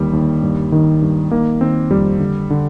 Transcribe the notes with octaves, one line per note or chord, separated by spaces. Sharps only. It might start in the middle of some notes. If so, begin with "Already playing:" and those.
Already playing: D#2 D3 G3
D#2
G2
D#3
G2
D#3 A#3
D#3 C4
F2 G3
D3
D3